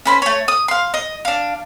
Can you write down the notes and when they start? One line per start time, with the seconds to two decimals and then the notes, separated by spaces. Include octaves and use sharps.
0.05 C#4 B4 C5
0.22 A3 C#5
0.48 D#6
0.68 F5 C6
0.94 D#5
1.25 D4 F5